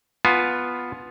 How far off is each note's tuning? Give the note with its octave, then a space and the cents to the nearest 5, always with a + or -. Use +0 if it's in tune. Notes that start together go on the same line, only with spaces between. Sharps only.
B3 +0 F4 +5 G#5 +45